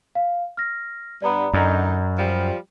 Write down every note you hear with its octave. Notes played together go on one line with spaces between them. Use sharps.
F5
F6 A#6
G2 B3 D5 A#5 B5
F#2 D3 D#4
F3 G3